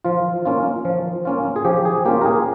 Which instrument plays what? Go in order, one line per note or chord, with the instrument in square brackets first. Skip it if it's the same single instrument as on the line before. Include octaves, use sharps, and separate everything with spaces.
[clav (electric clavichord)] F3 F4
A#3 C#4 F4
F3
A#3 C#4 F4
G#4
F3 G4
G#4
A#3 C#4 F4 G4
A#4
G#4